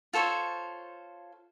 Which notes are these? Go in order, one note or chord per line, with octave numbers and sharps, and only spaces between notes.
F4 A4 C5 C#5